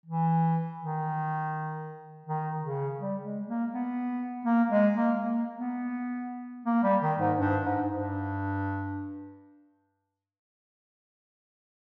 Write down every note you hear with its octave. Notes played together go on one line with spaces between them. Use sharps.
E3
D#3
D#3
C#3
G3
G#3
A#3
B3
A#3
G#3
A#3
A#3
B3
A#3
G3
D#3
G#2
G2
G#2
G2